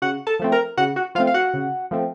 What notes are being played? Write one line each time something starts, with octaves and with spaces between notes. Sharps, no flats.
C#3 F#4 F#5
A4 A5
F3 A3 C4
A#4 A#5
C#3 F#4 F#5
F#4 F#5
F3 A3 C4 F4 F5
F5
F#4 F#5
C#3
F3 A3 C4